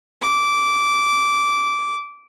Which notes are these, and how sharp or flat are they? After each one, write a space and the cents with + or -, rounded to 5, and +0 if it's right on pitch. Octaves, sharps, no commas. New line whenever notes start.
D6 -15